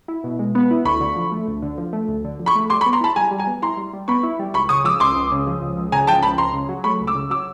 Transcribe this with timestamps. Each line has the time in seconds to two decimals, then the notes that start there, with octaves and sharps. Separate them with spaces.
0.08 E4
0.24 B2
0.39 G#3
0.55 B3
0.71 E4
0.85 D2 B5 C#6
1.01 D3
1.16 F3
1.32 A3
1.48 D2
1.62 D3
1.78 F3
1.93 A3
2.08 D2
2.25 D3
2.40 F3
2.46 B5 C#6
2.55 A3
2.70 G3 C6 D6
2.81 B5 C#6
2.86 B3
2.93 A#5 C6
3.01 E4 A5 B5
3.16 G3 G#5 A#5
3.31 G3
3.38 G#5 A#5
3.47 B3
3.62 E4 A#5 C6
3.77 G3
3.93 G3
4.08 B3 B5 C#6
4.23 E4
4.39 G3
4.54 C#2 B5 C#6
4.69 C#3 C#6 D#6
4.84 F3 D6 E6
5.00 C#2 C6 D6
5.16 C#2
5.32 C#3
5.47 F3
5.62 C#2
5.77 C#2
5.92 C#3 G#5 A#5
6.07 F3 G5 A5
6.23 C#2 A5 B5
6.38 C#2 A#5 C6
6.53 C#3
6.69 F#3
6.84 A3 B5 C#6
7.01 C#2
7.07 D6 E6
7.15 C#3
7.30 F#3 D6 E6